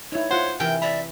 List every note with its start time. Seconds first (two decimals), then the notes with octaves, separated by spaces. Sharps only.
0.12 D#4 E4 C#5
0.31 F4 C5 F#5
0.60 C3 E3 E4 A#4 G5
0.82 D5 E5 A#5 B5